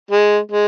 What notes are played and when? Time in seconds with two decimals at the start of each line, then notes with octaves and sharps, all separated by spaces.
0.11 G#3
0.51 G#3